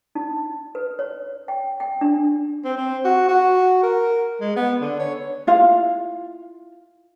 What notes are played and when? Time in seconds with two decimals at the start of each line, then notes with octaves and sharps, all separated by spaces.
0.15 D#4
0.75 B4
0.99 C#5
1.48 G5
1.80 G5
2.01 D4
2.64 C4
2.77 C4
3.04 F#4
3.28 F#4
3.83 A#4
4.41 G#3
4.56 B3
4.81 D3
5.00 C#5
5.47 E4 F4 F5